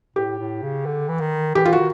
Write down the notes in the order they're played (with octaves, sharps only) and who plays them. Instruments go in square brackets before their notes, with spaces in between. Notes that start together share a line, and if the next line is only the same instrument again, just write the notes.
[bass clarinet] A2 [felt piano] G4
[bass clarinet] A2
C#3
D3
E3
D#3
[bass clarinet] E3 [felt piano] G4
[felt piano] F4
F#4
[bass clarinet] D#3